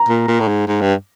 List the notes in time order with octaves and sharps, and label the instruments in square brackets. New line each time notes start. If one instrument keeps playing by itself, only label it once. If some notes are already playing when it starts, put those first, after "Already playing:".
Already playing: [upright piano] A#5
[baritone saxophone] A#2
A#2
A2
G#2
G#2
G2